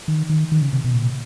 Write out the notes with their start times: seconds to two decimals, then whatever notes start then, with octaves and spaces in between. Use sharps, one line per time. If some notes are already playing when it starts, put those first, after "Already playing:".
0.08 D#3
0.29 D#3
0.52 D#3
0.62 C#3
0.73 C3
0.84 B2
0.94 A#2